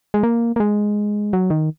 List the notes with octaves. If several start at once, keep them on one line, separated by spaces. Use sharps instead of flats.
G#3
A#3
A#3
G#3
F#3
D#3